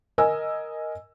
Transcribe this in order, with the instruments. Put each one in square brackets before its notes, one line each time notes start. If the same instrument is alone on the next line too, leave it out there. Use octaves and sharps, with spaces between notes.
[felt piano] A#4 D#5 G#5 E6